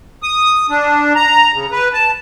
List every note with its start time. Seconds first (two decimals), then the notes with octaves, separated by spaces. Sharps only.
0.23 D#6
0.70 D4
1.15 A#5
1.54 C#3
1.72 B4
1.93 A5